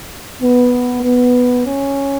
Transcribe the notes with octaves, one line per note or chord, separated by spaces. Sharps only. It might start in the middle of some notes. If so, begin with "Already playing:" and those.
B3
B3
C#4